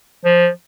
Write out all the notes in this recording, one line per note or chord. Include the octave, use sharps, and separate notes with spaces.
F3